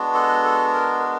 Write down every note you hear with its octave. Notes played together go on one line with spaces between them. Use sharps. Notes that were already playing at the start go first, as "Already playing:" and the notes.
Already playing: G#3 B3 D4 F#4
A4
A4
A#4
A#4